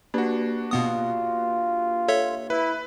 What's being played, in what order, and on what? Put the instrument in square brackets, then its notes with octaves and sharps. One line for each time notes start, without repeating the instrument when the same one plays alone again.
[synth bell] A#3 G4 B4 [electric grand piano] D4 F#4
[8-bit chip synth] B2 B3 D#6 [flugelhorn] F4
[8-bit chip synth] A4 C#5 E5
[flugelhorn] E4 [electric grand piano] B4